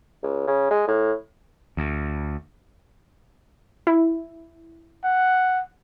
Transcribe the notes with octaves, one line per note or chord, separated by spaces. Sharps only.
C#2
C#3
G#3
A2
D2
E4
F#5